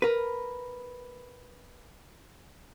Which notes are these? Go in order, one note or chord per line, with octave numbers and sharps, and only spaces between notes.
A#4 B4